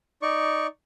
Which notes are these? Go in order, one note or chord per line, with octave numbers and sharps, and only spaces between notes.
D#4 D5 C#6